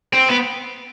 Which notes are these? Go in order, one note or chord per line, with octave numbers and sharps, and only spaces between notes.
C4
B3